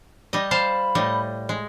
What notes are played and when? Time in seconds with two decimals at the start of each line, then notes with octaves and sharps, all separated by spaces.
0.33 G3 D#5
0.51 C5 F5 A5 B5
0.95 A2 G3 D#5
1.49 G#3